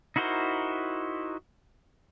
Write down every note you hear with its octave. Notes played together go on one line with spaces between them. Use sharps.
D#4 E4 F#4 A#4 C5